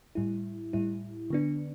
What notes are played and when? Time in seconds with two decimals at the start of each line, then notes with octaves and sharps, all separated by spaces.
0.15 A2 G3 E4
0.73 A2 G3 E4
1.30 D3 B3 D4